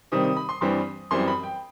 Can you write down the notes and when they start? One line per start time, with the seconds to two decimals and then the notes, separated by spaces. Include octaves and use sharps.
0.12 C3 D#3 G3 C4 D#6
0.24 D#6
0.37 B5
0.49 C6
0.61 G2 E3 G3 C4 C6
1.11 F#2 E3 G3 C4 C6
1.27 B5
1.43 G5